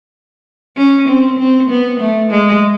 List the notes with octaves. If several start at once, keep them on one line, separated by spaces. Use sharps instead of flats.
C#4
C4
C4
B3
A3
G#3